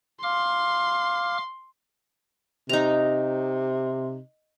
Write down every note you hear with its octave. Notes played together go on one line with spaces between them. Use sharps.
F5 C6 D6 F6
C3 D#4 A#5